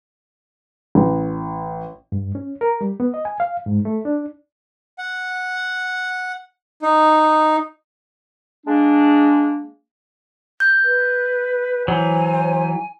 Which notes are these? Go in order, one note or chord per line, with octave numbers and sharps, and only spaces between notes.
A1
G2
C#4
A#4
G3
B3
D#5
G#5
F5
G#2
A3
D4
F#5
D#4
G#3 A#3 D4
G6
B4
E3 F#3 C5 C#5 G#5